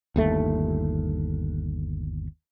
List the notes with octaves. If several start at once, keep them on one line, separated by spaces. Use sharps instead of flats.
G1 D#2 A3